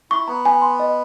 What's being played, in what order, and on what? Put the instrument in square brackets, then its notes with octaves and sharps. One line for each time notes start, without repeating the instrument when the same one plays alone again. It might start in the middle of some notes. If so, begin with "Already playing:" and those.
[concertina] E4 [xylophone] C#6
[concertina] B3 [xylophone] A#5
[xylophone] G#5
C6
D#5